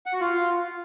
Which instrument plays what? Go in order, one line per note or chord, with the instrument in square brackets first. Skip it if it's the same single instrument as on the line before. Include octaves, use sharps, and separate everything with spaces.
[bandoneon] F#5
F#4
F4